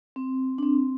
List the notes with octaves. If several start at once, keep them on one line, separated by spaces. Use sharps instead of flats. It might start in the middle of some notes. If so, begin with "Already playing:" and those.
C4
D4
C4